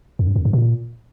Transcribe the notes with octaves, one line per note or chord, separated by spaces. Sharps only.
F2
G2
F2
G2
A#2